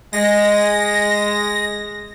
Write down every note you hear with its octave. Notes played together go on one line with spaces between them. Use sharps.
G#3 A#6